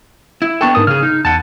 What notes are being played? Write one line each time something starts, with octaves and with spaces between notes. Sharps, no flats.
E4
B3 D4 A4 G5 C#6
G#2 A#4 D#6
C#3 G#4 F6
D#4
E2 F#5 A5